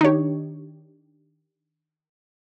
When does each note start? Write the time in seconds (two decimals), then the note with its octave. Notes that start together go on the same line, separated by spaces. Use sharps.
0.01 D#3 D4 D#4 G4 C#5